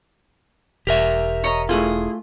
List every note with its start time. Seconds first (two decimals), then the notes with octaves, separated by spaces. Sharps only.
0.87 E1 G4 A#4 E5
1.44 C#5 D#5 A#5
1.69 A3 E4 F4 G#4